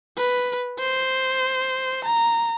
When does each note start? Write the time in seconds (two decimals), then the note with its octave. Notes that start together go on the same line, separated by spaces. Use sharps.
0.18 B4
0.79 C5
2.05 A#5